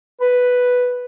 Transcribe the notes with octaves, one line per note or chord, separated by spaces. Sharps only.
B4